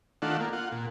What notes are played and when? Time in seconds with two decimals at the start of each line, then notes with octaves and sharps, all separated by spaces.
0.22 D#3 A3 D4 F4 F#5
0.40 A#3
0.53 F4 F#5
0.72 A#2